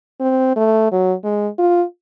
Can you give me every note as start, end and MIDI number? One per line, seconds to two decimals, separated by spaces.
0.20 0.52 60
0.56 0.87 57
0.92 1.14 54
1.24 1.48 56
1.59 1.83 65